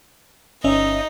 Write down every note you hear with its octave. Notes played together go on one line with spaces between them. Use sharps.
G1 C#4 D#4 D#5 E5